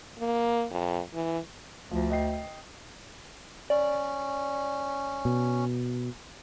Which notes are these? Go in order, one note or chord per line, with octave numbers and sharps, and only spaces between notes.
A#3
F2
E3
D2 F3
D#5 G5 C7
C#4 D5
B2